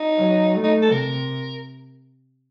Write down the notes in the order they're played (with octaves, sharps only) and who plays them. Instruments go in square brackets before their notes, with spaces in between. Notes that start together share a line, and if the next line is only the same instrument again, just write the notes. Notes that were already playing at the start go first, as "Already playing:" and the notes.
Already playing: [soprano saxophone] D#4
[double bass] F#3
A3
[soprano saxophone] D#4
A4
[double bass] C3 [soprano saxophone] A#4